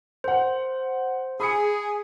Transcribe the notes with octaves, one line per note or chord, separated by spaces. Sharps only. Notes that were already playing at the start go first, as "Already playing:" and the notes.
A#4 C5 F#5
G#4 B5 D#6 C#7